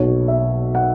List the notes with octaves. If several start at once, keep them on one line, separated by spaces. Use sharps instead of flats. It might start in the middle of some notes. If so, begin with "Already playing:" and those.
Already playing: B1 B2 C#5
E5
F#5